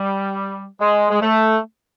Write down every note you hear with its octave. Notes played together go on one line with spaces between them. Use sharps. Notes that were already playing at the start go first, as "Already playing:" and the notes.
Already playing: G3
G#3
G#3
A3